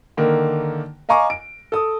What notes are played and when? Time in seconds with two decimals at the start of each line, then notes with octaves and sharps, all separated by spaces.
0.17 D3 D#3 A#3
1.09 D#5 F5 G#5 A#5 C#6 D6
1.30 D7
1.72 A4 D#6